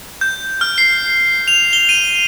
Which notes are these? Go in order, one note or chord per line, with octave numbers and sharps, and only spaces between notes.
G6
F6
C7
F7
G7
D#7